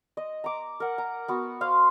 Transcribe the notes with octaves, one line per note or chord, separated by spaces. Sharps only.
D#5
A#5 D6
A#4 F#5
A#5
B3 F#4
C5 F5 C6